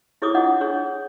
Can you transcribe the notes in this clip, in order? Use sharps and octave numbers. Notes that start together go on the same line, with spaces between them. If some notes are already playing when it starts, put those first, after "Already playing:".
E4 G#4 C#5 D6 D#6
D4 F4 D#5 F#5
D4 G#4 C#5